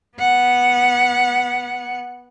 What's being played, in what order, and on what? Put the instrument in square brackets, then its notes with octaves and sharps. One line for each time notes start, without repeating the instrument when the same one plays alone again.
[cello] B3 F#5